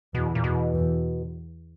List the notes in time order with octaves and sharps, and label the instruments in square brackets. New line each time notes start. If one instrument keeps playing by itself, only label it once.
[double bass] E2 [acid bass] B2
[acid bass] A#2
[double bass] E2 [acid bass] B2
[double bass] E2